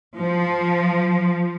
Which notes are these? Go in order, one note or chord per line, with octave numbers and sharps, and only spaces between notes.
F3